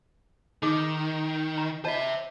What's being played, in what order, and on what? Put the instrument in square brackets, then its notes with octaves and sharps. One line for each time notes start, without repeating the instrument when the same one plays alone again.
[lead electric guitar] D#3 [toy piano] D#4 G#4 D6
[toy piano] A#5
[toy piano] F4 D#5 A5 [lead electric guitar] C5 E5